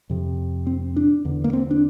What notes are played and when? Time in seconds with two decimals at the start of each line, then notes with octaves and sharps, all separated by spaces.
0.10 F2 C3
0.67 C4
0.96 D4
1.25 E2 D3
1.44 A#3
1.53 C4
1.71 D4